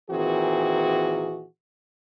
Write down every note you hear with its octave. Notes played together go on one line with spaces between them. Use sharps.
A#2 D#3 E3 C4 F#4 G#4